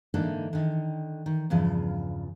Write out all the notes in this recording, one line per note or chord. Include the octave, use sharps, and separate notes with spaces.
G#2 D3 E3 A#3 D4 D#4
D3 D#3
D#3
E2 G2 C#3 F3